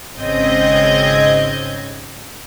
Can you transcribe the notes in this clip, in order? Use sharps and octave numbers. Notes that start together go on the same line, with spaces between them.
G#1 C#3 C4 D#5 G6 G#6